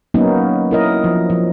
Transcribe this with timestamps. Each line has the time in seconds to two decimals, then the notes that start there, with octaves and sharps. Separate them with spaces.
0.14 F#3 A#3 B3 C#4 D#4
0.71 E4 A#4 D#5
1.04 F3
1.30 F3